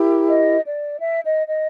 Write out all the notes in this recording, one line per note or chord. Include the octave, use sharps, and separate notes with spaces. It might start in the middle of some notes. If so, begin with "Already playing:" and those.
Already playing: E4 G4 A#4
D#5
D5
E5
D#5
D#5